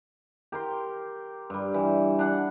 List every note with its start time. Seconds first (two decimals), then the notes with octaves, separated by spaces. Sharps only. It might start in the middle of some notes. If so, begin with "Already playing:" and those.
0.52 G4 A#4 C6
1.50 G2 G3
1.74 E3
2.19 D4 F#5